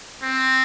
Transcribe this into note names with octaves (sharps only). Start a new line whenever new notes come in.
C4